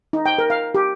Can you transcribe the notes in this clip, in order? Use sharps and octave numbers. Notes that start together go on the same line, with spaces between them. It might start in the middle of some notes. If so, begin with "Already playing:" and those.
D#4
G5
A#4
F5
G4